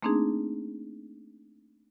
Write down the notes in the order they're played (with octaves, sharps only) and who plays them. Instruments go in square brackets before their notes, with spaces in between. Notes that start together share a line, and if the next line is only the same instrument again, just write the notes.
[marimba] A3 A#3 C4 D4 D#4 G#4